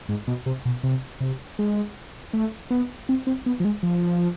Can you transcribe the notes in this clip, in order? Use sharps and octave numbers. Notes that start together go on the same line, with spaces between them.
G#2
B2
C3
B2
C3
C3
G#3
A3
B3
C4
C4
B3
F3
G#3
F3